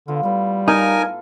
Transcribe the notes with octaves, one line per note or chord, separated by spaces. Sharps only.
D3 B3 F4
A2 G3 B4
D#4 A4 A#4 F5 G#5